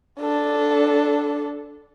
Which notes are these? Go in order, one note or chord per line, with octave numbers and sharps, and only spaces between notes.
D4 A4